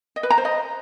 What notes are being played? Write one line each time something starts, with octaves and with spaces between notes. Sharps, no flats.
D#5
B4
A#5
C5
D#5